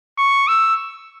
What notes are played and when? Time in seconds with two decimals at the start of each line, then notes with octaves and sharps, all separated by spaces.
0.18 C#6
0.48 E6